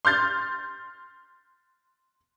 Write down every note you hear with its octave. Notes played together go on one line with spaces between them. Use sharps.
C6 F6 G6 A6